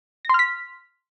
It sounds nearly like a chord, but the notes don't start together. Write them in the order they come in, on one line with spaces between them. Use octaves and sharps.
A#6 C6 F6 B6